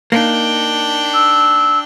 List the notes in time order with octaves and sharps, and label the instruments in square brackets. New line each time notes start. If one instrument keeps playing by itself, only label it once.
[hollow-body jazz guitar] A#3 D#4 [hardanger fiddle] D4 G5
[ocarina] E6